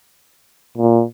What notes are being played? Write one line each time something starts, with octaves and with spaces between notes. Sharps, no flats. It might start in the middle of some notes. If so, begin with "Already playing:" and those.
A#2